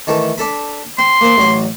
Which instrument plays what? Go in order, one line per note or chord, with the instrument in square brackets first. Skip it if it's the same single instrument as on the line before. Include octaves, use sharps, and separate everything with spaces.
[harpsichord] D#3 E3 A3
D4 A4 B5
[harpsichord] C4 [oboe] C6
[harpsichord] A#3 C5
A1 F#3 D6